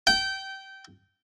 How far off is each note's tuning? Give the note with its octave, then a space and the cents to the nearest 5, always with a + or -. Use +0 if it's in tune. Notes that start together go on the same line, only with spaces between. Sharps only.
G5 -20